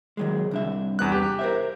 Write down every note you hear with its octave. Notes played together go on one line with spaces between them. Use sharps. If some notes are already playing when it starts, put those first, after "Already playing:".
D#3 F#3 G#3
C2 D4 E5
E2 B3 F#6
G4
A#4 C5 E5